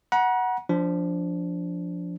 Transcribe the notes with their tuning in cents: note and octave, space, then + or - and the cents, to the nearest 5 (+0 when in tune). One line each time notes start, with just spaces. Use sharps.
F#5 +0 A#5 +45
F3 +0 D4 -15